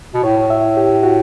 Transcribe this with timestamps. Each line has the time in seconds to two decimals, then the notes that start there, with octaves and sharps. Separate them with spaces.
0.14 B2
0.24 A2 C#5
0.50 E5
0.77 G4
1.03 F#4